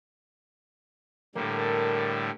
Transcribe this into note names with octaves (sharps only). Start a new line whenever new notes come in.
A2 D3 G3 A#3